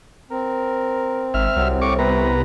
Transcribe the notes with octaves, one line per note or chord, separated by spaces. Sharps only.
C4 A#4
G#1 E5 F6
C2 F#3
A2 C#6 D6
C3 B3 B4 A#5